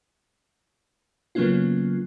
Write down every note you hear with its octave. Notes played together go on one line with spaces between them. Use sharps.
C#3 F#3 A#3 B3 C#4 F4